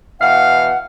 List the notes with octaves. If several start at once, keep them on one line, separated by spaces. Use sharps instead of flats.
B2 E3 F5 F#5